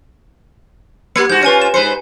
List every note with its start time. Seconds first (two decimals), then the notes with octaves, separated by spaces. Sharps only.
1.16 A#3 G4 G#6 C#7
1.30 G#2 F#4 G6
1.43 C#4 F4 B4 G#5 C#7
1.62 E7
1.74 G#2 B4 C5 C#7